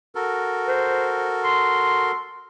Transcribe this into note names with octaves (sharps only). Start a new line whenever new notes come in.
F#4 A4 A#4
C5
C6